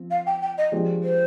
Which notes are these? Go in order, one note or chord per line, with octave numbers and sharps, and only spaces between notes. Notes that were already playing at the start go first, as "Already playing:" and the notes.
Already playing: F3 C4
F5
G5
G5
D#5
F3 G#3 D4 G4
C5